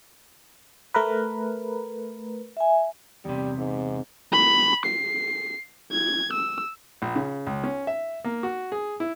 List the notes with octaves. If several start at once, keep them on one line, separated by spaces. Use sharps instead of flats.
A3 A#4 B4
E5 G#5
E2 C3 G3
G#2
B5
C7
G#6
E6
A#1
C#3
C#2
C#4
E5
A#3
F#4
G#4
E4